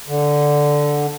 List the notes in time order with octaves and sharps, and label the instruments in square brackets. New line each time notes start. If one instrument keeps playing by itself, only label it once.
[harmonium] D3